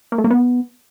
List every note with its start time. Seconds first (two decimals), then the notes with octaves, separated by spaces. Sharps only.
0.12 A#3
0.18 A3
0.24 A#3
0.30 B3